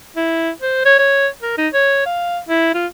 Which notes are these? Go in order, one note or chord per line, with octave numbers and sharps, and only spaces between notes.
E4
C5
C#5
C#5
A#4
D#4
C#5
F5
E4
F4